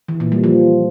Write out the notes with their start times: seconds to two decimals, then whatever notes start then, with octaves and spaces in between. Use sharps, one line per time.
0.08 E3
0.20 A#2
0.32 G3
0.44 F3